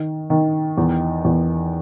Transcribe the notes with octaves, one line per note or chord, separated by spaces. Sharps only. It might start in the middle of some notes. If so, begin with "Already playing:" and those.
Already playing: D#3
D#3
E2
E2